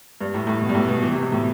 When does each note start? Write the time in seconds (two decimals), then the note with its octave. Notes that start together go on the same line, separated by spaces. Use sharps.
0.21 G2
0.34 A2
0.47 A2
0.62 B2
0.69 G2
0.75 A2
0.88 B2
1.02 E3
1.12 C3
1.23 B2
1.32 A2